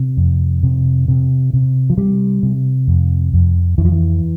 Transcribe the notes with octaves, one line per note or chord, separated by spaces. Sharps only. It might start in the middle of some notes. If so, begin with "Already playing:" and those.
Already playing: C3
F2
C3
C3
C3
F3
C3 G3
C3
F2
F2
F2 E3
F3
E3